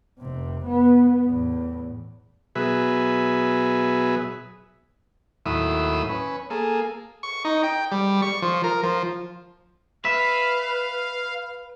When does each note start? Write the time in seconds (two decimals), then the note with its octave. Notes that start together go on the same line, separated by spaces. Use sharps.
0.19 F1 C3
0.66 B3
1.25 E2 A2
2.55 B2 F#3 G#4 B4 E5
5.46 D#2 A2 F#3 E4 E5 D#6
6.09 C#4 B4
6.50 A#3 G#4 A4
7.23 C#6
7.45 D#4
7.63 G5
7.92 G3
8.22 C#6
8.42 F3
8.64 A#4
8.83 F3
10.05 B4 E5 F5